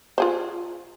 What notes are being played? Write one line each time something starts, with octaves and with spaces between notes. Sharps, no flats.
F4 G#4 C5